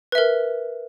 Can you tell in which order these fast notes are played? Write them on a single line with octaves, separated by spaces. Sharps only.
B4 E5 A#4